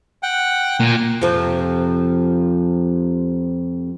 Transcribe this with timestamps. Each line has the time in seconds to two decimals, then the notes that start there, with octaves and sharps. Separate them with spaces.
0.23 F#5 G5
0.80 A#2
1.22 F2 C3 F3